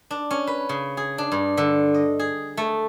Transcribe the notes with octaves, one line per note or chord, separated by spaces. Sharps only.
D4
C#4
B4
C#3
G#4
D4
G2
D3
D#5
G#4
A3